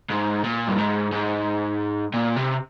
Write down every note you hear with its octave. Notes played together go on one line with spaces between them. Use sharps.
G#2
A#2
G2
G#2
G#2
A#2
C3